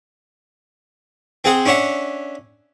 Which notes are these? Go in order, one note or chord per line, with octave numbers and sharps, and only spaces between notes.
C4 G#4 F#5
C#4 D4 C#5 E5 F#5